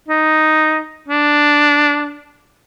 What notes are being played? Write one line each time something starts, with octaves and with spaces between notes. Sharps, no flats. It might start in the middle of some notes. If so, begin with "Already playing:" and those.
D#4
D4